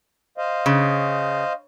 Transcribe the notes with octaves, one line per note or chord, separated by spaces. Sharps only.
C5 D#5 F5
C#3